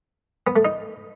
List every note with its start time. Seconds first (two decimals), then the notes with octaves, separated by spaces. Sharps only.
0.47 B3
0.56 A3
0.65 D#4